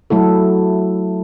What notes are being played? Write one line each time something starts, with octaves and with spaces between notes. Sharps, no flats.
F#3 A3 E4 A4